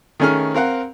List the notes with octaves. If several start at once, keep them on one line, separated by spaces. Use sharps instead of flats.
D#3 A3 C#4 G#4 F6
C4 A#4 F5 F#5